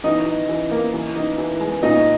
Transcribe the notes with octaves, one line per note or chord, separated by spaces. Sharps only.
E3 D#4 D#5
D#4
E3
A#3
E3
D#4
E3
G#3
A#2 D#4 D#5